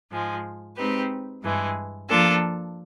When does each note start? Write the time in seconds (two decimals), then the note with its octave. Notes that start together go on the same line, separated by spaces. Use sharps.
0.10 G#2 F3 G#3
0.76 G#3 C4 D#4 G4 B4
1.42 G2 E3 G#3
2.09 F3 A#3 D4 F4 A4